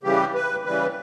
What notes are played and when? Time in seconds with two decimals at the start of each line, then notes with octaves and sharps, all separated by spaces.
0.03 C#3 E3 G3 G4
0.34 B4
0.65 C#3 E3 G3 B4